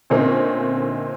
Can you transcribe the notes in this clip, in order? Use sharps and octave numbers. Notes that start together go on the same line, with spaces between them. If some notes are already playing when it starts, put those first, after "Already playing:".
A#2 D3 A3 C4 C#4 D#4